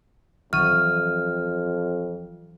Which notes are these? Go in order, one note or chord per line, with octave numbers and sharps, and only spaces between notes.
A#1 F2 D#3 E3 F#3 C#6 F6 D#7